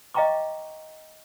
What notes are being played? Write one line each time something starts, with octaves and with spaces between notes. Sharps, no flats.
D#5 F5 G5 A#5 C#6 D6